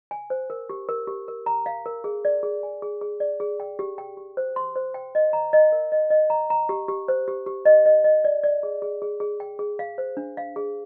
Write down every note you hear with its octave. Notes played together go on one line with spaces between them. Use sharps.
G#5
C5
A#4
G4
A#4
G4
A#4
A#5
F5
A#4
G#4
D5
G#4
G#5
G#4
G#4
D5
G#4
G5
G4
G5
G4
C5
C6
C5
G5
D#5
A#5
D#5
A#4
D#5
D#5
A#5
A#5
G4
G4
C5
G4
G4
D#5
D#5
D#5
D5
D5
G#4
G#4
G#4
G#4
G5
G#4
F5
C5
D4
F5
G#4